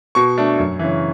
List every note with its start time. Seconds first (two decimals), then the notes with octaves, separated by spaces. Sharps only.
0.15 B2 C#6
0.38 A3 D4
0.58 F#2
0.79 C#3 E3